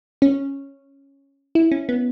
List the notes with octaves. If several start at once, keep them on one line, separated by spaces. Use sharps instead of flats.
C#4
E4
C#4
B3